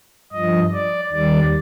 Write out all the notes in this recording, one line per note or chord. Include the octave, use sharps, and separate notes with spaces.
G2 F3 D#5
D5
D#2 D#3 G3 D5